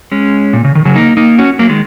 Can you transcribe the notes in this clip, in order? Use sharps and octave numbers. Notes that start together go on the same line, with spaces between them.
G#3 C#4
A#2
C#3
D#3
C#3 F#3
A#3 D#4
A#3 D#4
C#4 F#4
F#3 A#3
D#3 G#3